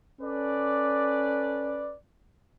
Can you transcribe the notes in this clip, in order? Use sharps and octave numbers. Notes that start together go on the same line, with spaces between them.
C#4 A4 B4 D5